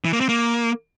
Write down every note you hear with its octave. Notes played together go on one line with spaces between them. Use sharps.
E3
A#3
C4
A#3